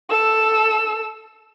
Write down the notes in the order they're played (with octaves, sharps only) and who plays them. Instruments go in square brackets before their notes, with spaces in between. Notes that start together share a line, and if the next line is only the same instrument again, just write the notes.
[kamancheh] A4 E6